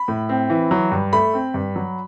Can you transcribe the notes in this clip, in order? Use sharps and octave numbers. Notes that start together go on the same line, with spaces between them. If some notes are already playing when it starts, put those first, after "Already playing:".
Already playing: B5
A2
C4
E3
F#3
G2
A3 B5
C4
G2
F#3